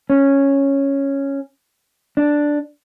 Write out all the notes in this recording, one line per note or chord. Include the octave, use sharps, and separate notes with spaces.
C#4
D4